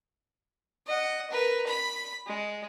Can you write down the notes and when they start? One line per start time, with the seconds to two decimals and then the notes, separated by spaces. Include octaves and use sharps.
0.87 D#5 F#5
1.31 A#4 B4
1.67 B5
2.27 G#3